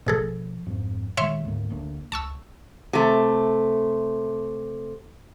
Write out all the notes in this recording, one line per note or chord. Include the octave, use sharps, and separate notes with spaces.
A1 B2 F3 G#4 A4
F2 G#2 C4
A#2 D#3 G#3 C#5 E5 C6
D2 G#2 A#3
D2 A#3 D4
C#2 A5 C#6 E6
C3 A3